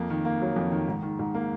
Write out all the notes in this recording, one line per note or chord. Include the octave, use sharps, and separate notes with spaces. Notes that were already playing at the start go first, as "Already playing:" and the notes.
Already playing: F2 A#3
D#3
A#3
F#3
F2
D#3
G#2
D#3
G#2
A#3